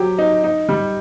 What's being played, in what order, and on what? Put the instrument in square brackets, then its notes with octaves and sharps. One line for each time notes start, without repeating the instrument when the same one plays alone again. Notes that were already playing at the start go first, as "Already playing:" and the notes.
Already playing: [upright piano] F#3 G4
D#4
D#4
G3